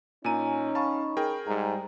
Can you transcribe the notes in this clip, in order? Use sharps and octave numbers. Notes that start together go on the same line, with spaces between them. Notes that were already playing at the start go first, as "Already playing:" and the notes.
A#2 C#4 D#4 G#5 A#5 D#7
F5 A5 B5 C#6
G#4 A#4 G5
G#2 G3 A#5